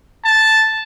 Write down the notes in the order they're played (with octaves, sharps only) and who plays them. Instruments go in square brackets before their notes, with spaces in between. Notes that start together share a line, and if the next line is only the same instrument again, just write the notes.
[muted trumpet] A5